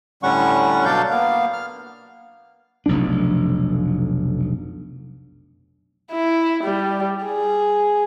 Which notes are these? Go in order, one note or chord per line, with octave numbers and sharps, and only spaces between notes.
A2 D3 G3 C#4 F#5 C#6
B2 F#3 D4 D5 F5 G6
A#3 B3 F5
F6
F1 B1 F2 D4
E4
G3
G#4